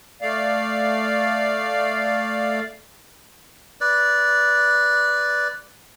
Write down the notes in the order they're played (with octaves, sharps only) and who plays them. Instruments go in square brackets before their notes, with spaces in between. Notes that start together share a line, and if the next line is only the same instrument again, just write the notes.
[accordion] A3 D5 F5
[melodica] B4 D5